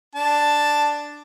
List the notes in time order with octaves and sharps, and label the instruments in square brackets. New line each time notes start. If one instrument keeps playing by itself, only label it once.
[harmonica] D4 A5